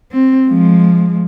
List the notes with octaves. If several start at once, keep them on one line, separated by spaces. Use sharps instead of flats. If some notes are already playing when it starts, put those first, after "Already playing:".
C4
F3 G#3